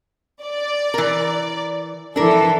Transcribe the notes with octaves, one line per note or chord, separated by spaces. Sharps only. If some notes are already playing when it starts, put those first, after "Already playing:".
D5
E3 A#4
E3 D4 A4 A#4